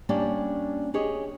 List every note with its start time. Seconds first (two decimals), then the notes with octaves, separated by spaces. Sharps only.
0.09 G3 A#3 C#4 D4
0.94 G4 G#4 C#5 D#5